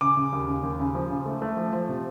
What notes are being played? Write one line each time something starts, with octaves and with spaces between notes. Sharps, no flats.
C#3 D6
C#3
D#2
C#3
D#2
C#3
F3
C#3
A3
A3
F3
F3
C3